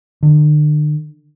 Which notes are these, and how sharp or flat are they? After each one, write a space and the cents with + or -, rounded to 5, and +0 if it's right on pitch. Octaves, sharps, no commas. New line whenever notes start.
D3 +40